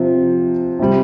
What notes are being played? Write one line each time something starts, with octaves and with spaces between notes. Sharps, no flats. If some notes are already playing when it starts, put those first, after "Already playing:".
Already playing: C3 F3
C3 G3